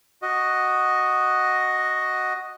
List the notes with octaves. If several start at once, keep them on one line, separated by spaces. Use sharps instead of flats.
F#4 D#5